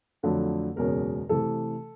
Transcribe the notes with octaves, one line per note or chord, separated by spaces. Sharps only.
F2 D3 F#3 A3
F#1 E2 B2 G#3 C#4 A#4
C3 E3 A3 A4